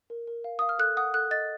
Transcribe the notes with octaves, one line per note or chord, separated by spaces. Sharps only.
A#4
A#4
F5
F5 D#6
F6
A4 F#6
F#5 D#6
A4 F#6
D#5 A6